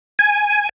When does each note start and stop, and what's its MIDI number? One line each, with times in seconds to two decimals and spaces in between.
0.19 0.69 80